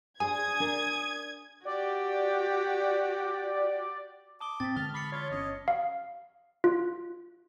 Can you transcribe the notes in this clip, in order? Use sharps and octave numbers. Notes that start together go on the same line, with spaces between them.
D4 G#4 C5 G#5 D#6 G#6
D4 A#4
F#4 G4 D5
A5 D6 D#6 G7
A2 C4 A6 B6
D3 E3 G#3 A5 F6 G7
B5 D6 C7 C#7
F4 C#5
G1 B2 C#4 D#5
F5
F4